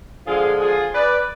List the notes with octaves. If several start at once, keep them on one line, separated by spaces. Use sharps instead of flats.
D3 F3 G#3 F4 G#4
F4 G#4
B4 D5